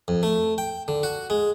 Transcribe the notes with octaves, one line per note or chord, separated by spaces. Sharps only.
F2
A3
G5
D3
F#4
G#3